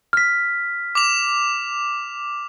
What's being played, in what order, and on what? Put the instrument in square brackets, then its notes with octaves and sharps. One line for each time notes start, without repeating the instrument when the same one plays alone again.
[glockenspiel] F6 B6
[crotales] D6 F7